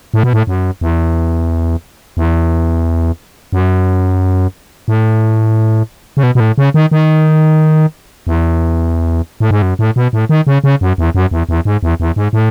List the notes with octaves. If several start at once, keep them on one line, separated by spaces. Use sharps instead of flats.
A2
B2
A2
F#2
E2
E2
F#2
A2
C#3
B2
B2
A2
C#3
D#3
D#3
E2
A2
G#2
F#2
A2
B2
A2
D#3
C#3
C#3
F#2
E2
F#2
E2
E2
G#2
E2
E2
G#2
A2